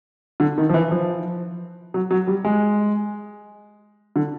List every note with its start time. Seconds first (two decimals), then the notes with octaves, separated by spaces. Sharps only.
0.40 D3
0.58 D#3
0.70 F3
0.74 E3
0.91 F3
1.94 F#3
2.11 F#3
2.27 G3
2.44 G#3
4.16 D3